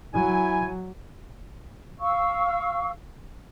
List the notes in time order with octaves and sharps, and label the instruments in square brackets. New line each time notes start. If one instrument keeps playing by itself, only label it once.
[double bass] F#3 [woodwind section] E4 G#5
[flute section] F5 C#6 E6